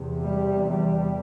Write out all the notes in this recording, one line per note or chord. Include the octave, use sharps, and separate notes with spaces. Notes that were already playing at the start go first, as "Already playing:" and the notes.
Already playing: E2 C3
G3
G3